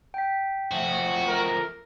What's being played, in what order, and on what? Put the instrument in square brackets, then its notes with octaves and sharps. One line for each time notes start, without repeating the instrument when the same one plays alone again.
[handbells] G5 B6
[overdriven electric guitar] F3 A3 [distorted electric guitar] F#4
[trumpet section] A#4